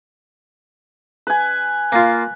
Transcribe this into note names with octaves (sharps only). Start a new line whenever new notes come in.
B4 G#5
A#3 F4